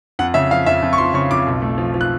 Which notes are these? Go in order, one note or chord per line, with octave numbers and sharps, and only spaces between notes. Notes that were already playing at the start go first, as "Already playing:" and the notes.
F2 F#5
C#3 E5
F3 F5
F2 E5
F2
C#6
F3 C6
C#3 C#6
F2 D6
B1
A3
F3
F3
F#6